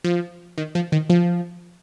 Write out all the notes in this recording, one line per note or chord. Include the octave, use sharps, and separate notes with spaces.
F3
D#3
F3
D#3
F3